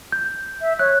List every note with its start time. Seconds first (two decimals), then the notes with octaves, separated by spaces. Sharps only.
0.12 G6
0.61 E5
0.79 C#5 F#6